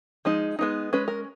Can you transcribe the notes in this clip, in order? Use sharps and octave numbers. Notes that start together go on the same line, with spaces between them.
F3 G#3 D#4
G#3 B3 D#4
G#3 C#4 B4
A#4